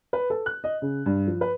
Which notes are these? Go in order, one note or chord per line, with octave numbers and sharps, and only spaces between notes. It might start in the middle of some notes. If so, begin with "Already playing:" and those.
B4
A4
F#6
D#5
C#3
G2
F3
B4